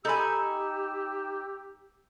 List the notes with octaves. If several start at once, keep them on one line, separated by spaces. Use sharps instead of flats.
D#4 G4 A4 G#5 B5 E6